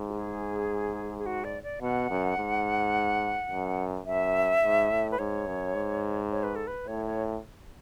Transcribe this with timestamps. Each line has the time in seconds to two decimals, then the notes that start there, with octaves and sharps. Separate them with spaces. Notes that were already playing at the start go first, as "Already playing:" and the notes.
Already playing: G#2
0.09 F#4
0.13 G#4
1.19 G#4
1.26 F#4
1.44 D5
1.63 D5
1.82 B2 F#5
2.10 F#2
2.38 G#2
3.50 F#2
4.06 F#2 E5
4.63 G#2
4.91 A2
5.12 B4
5.19 G#2 C#5
5.47 F#2
5.75 G#2
6.31 C#5
6.43 B4
6.56 A4
6.67 B4
6.88 A2 C#5
7.06 C#5